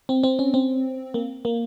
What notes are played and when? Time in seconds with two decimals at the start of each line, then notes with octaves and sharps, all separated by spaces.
0.09 C4
0.23 C4
0.39 C#4
0.54 C4
1.14 A#3
1.45 A#3